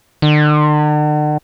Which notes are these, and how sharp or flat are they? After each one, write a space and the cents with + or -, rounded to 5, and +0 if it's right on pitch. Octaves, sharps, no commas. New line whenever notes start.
D3 +45